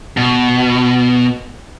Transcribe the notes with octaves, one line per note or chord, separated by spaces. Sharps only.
B2